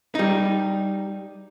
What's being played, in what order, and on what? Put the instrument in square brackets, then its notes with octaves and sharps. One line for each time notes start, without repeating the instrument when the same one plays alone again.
[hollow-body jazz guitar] G3 D#4